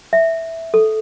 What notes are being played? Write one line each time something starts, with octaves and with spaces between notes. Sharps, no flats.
E5
A4